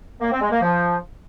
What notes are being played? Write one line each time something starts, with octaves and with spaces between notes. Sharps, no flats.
A#3
C4
G#3
A#3
F3